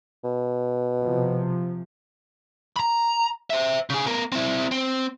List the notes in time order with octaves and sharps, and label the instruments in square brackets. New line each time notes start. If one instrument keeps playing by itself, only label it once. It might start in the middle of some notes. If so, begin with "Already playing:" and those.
[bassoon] B2
[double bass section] C3 F3
[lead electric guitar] A#5 B5
C5 E5
C#3 G#4
B3 A#4
C4 E4
C4